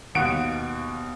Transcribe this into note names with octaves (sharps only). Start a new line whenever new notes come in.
D#2 B2 F5 F#5 D7